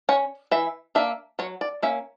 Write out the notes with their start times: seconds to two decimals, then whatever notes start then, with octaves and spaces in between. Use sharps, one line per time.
0.09 C#4 C#5
0.51 E3 E5
0.95 A#3 D4 E5
1.39 F#3 C#5
1.61 D5
1.82 A#3 C#4 E5